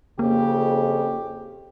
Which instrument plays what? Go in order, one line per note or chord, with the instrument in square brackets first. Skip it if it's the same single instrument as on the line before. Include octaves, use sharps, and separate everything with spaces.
[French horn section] F2 C#3 [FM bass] A#3 [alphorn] G4